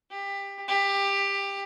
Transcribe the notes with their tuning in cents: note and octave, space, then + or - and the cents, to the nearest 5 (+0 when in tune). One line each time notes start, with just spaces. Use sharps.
G4 +20
G4 +20